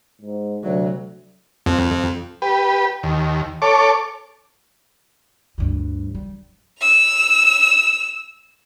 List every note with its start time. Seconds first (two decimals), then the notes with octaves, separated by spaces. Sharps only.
0.21 G#2
0.63 D2 C3 F#3
1.66 F2
2.42 G4 B4
3.03 D#2
3.62 A4 C#5 D6
5.58 D2 G2
6.15 G3
6.81 E6 F7